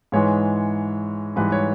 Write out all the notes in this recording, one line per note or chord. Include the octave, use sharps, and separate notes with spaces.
G#2 E3 G#3 C#5
G#2 E3 G3 B4
C#5